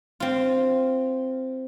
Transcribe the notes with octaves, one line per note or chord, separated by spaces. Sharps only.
C4 F4